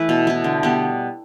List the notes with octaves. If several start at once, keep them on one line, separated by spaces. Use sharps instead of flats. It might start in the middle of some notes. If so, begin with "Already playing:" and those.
Already playing: E3 A3 E4 B4
B2
B3 E4
D3
G3 B3